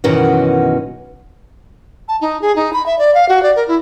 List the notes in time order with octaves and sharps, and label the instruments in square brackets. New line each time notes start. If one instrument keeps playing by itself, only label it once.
[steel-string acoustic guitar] F#2 B2 D#3 E3 C#4 F#4
[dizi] A5
D#4
G#4
D#4
B5
E5
D5
F5
F#4
D5
A#4
E4